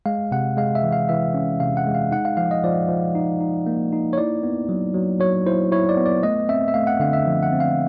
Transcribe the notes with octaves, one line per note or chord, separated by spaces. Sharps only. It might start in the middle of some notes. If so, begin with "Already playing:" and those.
G#3 F5
C3 F#5
G#3 F5
E5
E3
F5
E3 E5
C#4
C3 F5
F#5
G#3
F5
D#4 F#5
F5
F3 F5
D#5
F3 D5
F3
D#4
D#4
A#3
D#4
C#5
E4 D5
B3
F#3
F#3
F#3 C#5
E4 C5
E4 C#5
D5
B3
D5
A3 D#5
C4 E5
E5
A3 F5
F#5
D3 F5
E5
F3
F#5
C4
F5